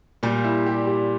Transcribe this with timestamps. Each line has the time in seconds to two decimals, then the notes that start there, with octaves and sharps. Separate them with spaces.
0.23 A#2 G3
0.44 E4
0.66 G4
0.87 G4